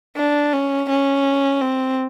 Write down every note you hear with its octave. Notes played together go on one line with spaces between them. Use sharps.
D4
C#4
C#4
C4